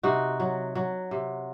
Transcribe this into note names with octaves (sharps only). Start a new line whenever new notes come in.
C3 D#4 F#4
F#3
F#3
C3